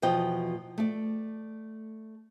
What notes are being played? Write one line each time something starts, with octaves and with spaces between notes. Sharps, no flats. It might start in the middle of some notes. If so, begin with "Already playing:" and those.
E2 B2 F3 D#5 G5
A3 D5